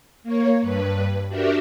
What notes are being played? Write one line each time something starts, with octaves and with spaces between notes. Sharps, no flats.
A#3 C#5
G2 B4
D4 F#4 G4 A#4 E5